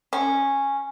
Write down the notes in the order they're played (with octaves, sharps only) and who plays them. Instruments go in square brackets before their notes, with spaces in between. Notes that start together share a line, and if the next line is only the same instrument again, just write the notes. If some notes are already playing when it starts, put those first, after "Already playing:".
[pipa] C#4